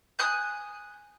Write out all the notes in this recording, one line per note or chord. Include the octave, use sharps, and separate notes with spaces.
G#5 D#6 F#6 G6